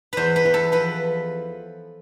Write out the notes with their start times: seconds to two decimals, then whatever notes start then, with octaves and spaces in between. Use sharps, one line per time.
0.13 E2 B4 C5
0.36 B4
0.46 E2
0.54 A4
0.72 F3 B4